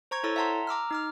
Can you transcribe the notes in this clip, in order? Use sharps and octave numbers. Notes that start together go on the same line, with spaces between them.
C5 A#5 C#6 G#6
E4 A4 C#5 E6 A6
E5 F#5 A5 A#5 C6
A#5 D6 E6 F6
D#4 D6 F6